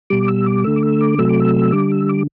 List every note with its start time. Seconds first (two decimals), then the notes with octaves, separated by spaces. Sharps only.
0.10 B2 G3 D6
0.28 E6
0.46 D6
0.64 D3 A3 E6
0.76 D6
0.83 E6
1.01 D6
1.18 C3 F#3 A3 E6
1.29 D6
1.40 E6
1.72 D3 G3 D6
1.92 E6
2.09 D6